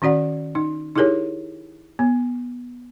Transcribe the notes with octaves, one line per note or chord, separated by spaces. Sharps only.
D#3 C#4 F#4 D5 F#5
D#4
D#4 E4 G4 G#4 A#4 C#5
B3